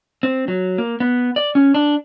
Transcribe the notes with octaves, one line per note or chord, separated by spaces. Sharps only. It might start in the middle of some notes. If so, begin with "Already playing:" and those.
C4
F#3
A#3
B3
D5
C#4
D4